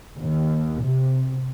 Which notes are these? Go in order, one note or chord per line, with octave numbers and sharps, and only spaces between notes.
D#2
C3